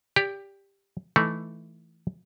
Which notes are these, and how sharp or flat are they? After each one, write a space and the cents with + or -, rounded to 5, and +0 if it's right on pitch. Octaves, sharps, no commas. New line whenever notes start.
G4 +10 D5 -25
E3 +5 A3 +0 D#4 +15